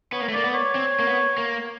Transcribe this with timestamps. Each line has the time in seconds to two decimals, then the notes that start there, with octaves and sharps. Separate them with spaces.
0.13 B3 C#5
0.21 A#3
0.29 A3
0.33 A#3 D5
0.44 B3
0.54 C#5
0.75 C4
0.99 A#3
1.07 B3
1.38 A#3